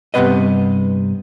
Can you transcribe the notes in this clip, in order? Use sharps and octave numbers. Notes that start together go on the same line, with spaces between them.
G2 C3 E3 B3 B4 D#5